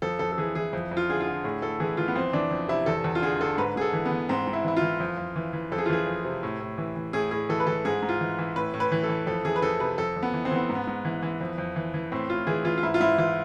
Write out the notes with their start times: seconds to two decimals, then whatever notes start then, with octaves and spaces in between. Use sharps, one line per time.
0.02 F2 A4
0.19 F2 A4
0.32 A4
0.38 E3 G#4
0.55 E3 G#4
0.73 F2
0.91 F2
0.97 F4
1.09 D3 G#4
1.21 F4
1.27 D3
1.44 A2 G#4
1.62 A2 A4
1.80 E3 G#4
1.97 E3 F4
2.08 B3
2.16 F2 C4
2.33 E3 D4
2.51 F2
2.68 C3 E4
2.86 E2 A4
3.04 E2
3.15 F4
3.22 D3 G#4
3.40 D3 A4
3.58 G#2 B4
3.76 G#2 G#4
3.81 A4
3.93 E3
4.06 B3
4.11 E3
4.29 G#2 C4
4.47 G#2
4.53 E4
4.64 E3 E4
4.77 F4
4.82 E3
5.00 F2
5.17 F2
5.36 E3
5.53 E3
5.72 F2 A4
5.78 G#4
5.86 F4
5.89 E3 G#4
6.07 F2
6.25 C3
6.43 A2
6.60 A2
6.78 E3
6.96 E3
7.13 A2 G#4
7.31 A2 G#4
7.49 E3 A4
7.60 B4
7.67 E3 A4
7.85 G#2 G#4
8.02 G#2
8.09 F4
8.21 E3
8.39 E3
8.56 A2 B4
8.74 A2
8.80 B4
8.92 E3
9.04 A4
9.09 E3
9.27 F2 A4
9.45 E3 G#4
9.56 B4
9.62 F2 A4
9.80 C3 B4
9.98 F2 A4
10.17 F2
10.23 B3
10.34 E3
10.45 C4
10.52 E3 B3
10.69 G#2
10.75 B3
10.87 G#2
11.05 E3
11.23 E3
11.41 F2
11.58 F2
11.76 E3
11.94 E3
12.12 A2 C4
12.30 A2 F4
12.47 E3 G#4
12.65 E3 F4
12.78 F4
12.83 G#2 E4
12.94 F4
13.00 G#2 E4
13.18 E3 F4